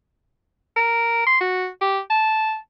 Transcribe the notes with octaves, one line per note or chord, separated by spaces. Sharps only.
A#4
C6
F#4
G4
A5